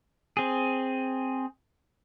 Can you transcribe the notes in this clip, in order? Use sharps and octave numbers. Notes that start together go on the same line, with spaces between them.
C4 G#4